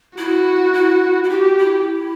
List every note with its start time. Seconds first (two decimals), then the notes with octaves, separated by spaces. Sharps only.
0.17 E4 F#4
0.74 E4
1.24 E4
1.30 F#4 G4
1.58 E4